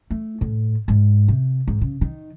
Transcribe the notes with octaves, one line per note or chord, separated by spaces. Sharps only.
A3
A2
G#2
C3
G#2
C#3
D#3